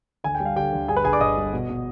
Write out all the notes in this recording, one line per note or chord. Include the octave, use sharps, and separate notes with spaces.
D2 G#5
G5
G3
F5
D3 G4 G5
D2
G2 G#4 G#5
B4 B5
G1 G#4 G#5
D5 D6
G1 D#5 D#6
G2
B2
B2